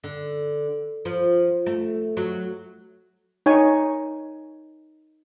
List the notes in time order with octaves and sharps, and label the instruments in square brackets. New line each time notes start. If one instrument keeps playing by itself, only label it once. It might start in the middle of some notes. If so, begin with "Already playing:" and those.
[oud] D3
F3
A3
F#3
[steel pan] D#4 C#5 G#5